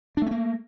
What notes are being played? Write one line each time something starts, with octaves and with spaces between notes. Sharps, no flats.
A3 A#3 C#4 D4